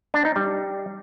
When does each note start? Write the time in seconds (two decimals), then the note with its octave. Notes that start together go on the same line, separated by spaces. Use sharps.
0.14 D4
0.25 D#4
0.36 G3